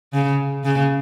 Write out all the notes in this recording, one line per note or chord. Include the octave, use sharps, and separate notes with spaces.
C#3
C#3